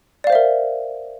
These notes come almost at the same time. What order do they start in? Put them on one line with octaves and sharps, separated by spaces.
D5 F5 C5 E5 A#4